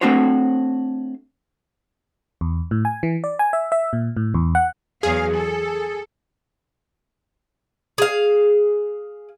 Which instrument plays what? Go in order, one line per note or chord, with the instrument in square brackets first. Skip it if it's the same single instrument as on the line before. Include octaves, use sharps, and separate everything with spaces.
[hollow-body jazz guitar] A3 C4 D4 F#4 C5 C#5
[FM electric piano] E2
A2
G#5
E3
D5
G#5
E5
E5
A#2
A2
E2
F#5
[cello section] E2 F#3 F5 [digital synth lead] G#4
[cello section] A4
[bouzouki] G#4 F5